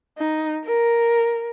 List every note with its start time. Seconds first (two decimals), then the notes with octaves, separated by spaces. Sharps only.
0.18 D#4
0.65 A#4